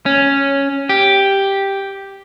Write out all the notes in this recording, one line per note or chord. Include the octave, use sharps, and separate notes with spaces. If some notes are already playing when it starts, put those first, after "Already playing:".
C#4
G4